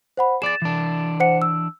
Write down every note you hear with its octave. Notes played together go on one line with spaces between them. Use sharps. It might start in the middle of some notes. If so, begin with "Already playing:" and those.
C5 F#5 B5
G#4 D5 A6 E7
E3 D4
C5 F#5 C#7
E6